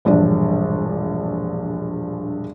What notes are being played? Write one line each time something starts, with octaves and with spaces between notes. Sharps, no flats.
E1 A#1 G2 D4